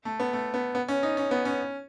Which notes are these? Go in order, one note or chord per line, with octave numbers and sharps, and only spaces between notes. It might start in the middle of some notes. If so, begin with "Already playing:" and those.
A3
B3
A3
B3
B3
C#4
D#4
C#4
B3
C#4